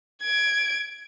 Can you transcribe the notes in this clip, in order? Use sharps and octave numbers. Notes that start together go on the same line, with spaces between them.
G#6 D7